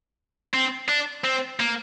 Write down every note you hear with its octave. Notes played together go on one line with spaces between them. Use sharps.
C4
D4
C4
A#3